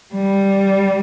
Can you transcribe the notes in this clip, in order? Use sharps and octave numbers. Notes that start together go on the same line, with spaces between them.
G3